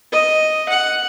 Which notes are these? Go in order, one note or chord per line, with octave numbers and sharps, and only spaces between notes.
D#5
F#5